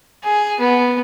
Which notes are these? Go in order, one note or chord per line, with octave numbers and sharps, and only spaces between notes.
G#4
B3